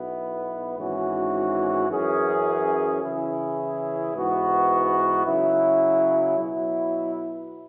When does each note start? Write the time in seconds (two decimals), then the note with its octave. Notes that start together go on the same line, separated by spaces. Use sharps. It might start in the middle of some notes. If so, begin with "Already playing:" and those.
Already playing: B1 B2 B3 E4 B4
0.77 G#1 G#2 E3 C#4 F#4
1.89 F#2 E3 C#4 G#4
3.01 C#3 E3 C#4 E4 G#4
4.13 G#2 E3 B3 F#4
5.25 C#3 F#3 E4
6.37 B2 F#3 E4